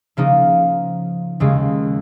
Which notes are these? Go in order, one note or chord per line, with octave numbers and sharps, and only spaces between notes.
C#3 F3 A#3 D#4
D#2 C#3 G#3